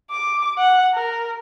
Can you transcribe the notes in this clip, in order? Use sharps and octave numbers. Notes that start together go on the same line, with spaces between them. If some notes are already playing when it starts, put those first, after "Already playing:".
D6
F#5
A#4